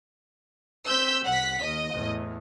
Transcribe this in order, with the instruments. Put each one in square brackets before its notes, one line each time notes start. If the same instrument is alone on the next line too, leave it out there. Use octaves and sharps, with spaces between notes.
[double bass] C4 [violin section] E6 G6 B6
[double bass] C2 [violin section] F#5 B6
[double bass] D#2 [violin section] D#5
[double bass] E2 A2